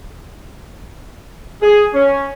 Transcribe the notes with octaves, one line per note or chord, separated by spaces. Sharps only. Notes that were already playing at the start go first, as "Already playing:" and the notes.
G#4
C#4